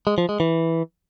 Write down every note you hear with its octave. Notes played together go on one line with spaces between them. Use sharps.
G#3
F3
G#3
E3